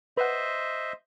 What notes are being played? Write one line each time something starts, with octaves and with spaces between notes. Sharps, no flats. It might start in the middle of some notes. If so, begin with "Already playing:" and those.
B4 C5 D#5 E5 F#5